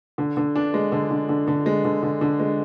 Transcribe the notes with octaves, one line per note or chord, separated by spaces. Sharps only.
D3
D3
D4
G#3
D3
D3
D3
D3
G#3
D3
D3
D3
G#3